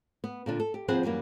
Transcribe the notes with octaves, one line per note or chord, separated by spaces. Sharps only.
B3
A#2 D3 D4
A4
G4
D#2 F3 C4 G#4 B4 F#5
F#2 E3 G3 A#3